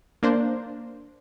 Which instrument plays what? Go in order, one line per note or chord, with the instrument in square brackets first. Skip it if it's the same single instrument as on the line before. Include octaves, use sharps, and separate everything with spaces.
[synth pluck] A#3 D4 C5